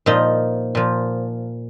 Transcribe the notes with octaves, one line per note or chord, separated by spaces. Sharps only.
A#2 F3 D#4
A#2 F3